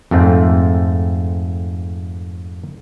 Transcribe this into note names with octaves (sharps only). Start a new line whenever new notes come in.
F2 G#2 A3 C4